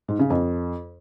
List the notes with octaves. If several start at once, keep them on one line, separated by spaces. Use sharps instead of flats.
G#2
C#3
F2